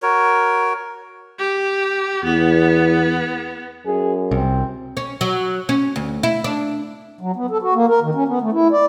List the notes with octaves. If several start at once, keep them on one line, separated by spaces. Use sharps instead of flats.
F#4 A#4 C#5
G4
E2 B3
F#2 G#4
C2 C4
C#4
F#3
C#4
D2
E4
D4
F#3
B3
A4
F#4
A#3
A#4
D#3
C#4
B3
A3
E4
D5